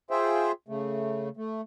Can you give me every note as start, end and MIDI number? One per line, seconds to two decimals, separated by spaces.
0.11 0.52 65
0.11 0.52 68
0.11 0.52 72
0.11 0.52 76
0.11 0.52 79
0.68 1.29 49
0.68 1.29 57
1.37 1.61 57